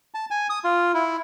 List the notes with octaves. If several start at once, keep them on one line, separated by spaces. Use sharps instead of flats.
A5
G#5
D#6
F4
E4